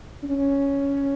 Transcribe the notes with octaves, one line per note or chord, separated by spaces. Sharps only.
C#4